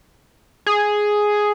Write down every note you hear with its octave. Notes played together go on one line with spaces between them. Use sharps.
G#4